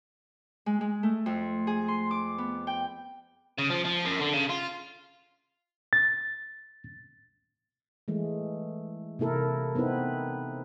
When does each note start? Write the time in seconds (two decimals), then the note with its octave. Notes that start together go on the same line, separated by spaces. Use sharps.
0.66 G#3
0.81 G#3
1.03 A3
1.26 F2
1.67 G#4
1.88 C6
2.11 D6
2.38 B3
2.67 G5
3.58 C#3
3.70 F3
3.85 F3
4.05 F#2
4.19 D3
4.34 C#3
4.50 F4
5.93 A6
8.08 E3 G#3 A3
9.19 C3 A#3 E4 A4 A#4
9.75 B3 C4 D#4 E4 B4